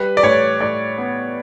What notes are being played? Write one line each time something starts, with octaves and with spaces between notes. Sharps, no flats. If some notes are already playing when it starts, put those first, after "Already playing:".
Already playing: G3 B4
D5
A2 C#5
A2 D5
B3